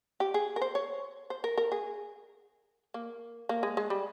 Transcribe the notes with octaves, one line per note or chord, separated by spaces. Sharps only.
G4
G#4
A#4
C5
C#5
C5
A#4
A#4
G#4
A#3
A#3
G#3
G#3
G3